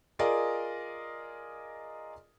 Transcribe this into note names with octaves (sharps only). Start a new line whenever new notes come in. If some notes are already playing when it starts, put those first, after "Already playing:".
F4 G#4 A#4 D5 D#5